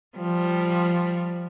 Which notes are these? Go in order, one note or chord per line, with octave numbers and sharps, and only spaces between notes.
F3 G3